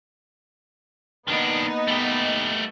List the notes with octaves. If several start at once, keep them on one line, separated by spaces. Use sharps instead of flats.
D#3 A#3 B3 D4 D#4
A3 G4